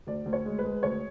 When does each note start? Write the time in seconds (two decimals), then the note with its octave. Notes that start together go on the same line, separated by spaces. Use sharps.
0.07 D2 D5
0.26 D2
0.33 C#5
0.45 G#3
0.59 B4
0.64 G#3
0.83 D2 C#5